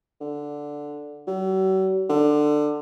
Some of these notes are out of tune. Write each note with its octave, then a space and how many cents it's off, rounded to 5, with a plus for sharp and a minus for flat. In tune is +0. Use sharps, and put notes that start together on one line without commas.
D3 +0
F#3 +40
D3 +20